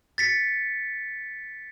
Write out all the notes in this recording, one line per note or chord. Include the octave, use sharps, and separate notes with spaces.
A6 B6 C#7